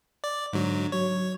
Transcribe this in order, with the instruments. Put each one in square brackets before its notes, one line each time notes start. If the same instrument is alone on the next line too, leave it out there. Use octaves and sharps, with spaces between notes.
[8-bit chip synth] D5
[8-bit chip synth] G#2 F#3 [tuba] D3
[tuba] F#3 [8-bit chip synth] C#5